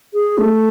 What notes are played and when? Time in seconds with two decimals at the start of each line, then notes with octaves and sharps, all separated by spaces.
0.13 G#4
0.38 A3